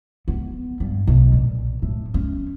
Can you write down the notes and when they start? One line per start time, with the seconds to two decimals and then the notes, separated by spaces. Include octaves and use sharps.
0.28 B3
0.80 G2
1.07 B1
1.33 A#2
1.82 A2
2.14 C#4